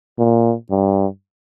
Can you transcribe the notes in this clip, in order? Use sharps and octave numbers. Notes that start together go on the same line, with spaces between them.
A#2
G2